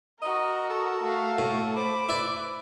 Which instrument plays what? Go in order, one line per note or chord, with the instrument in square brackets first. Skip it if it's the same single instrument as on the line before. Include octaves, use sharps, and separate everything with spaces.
[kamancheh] F#4 A#5 [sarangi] A#4 [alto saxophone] D#5
[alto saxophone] A4
[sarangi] A3 [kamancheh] F#4 F5
[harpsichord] A2
[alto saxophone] C5 [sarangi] B5 [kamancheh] D6
[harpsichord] E4 D5 [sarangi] B4